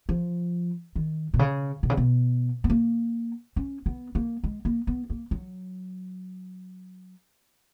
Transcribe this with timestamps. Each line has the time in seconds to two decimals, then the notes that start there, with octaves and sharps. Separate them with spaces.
0.09 F3
0.96 D#3
1.34 B2
1.39 C#3
1.83 B2
1.90 C#3
1.97 B2
2.64 B3
2.70 A#3
3.56 C#4
3.86 B3
4.15 A#3
4.44 G#3
4.65 A#3
4.87 B3
5.10 A#3
5.31 F#3